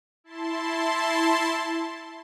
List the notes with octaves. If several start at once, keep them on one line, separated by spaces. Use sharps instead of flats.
E4 A5 C6